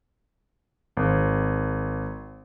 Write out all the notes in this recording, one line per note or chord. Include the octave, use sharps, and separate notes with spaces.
G#1